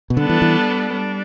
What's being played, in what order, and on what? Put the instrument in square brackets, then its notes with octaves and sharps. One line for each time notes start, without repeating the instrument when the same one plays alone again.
[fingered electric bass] B2
[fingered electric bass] D3 [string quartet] G3 B3 D4 A4
[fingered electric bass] E3
E3
[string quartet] G3 D4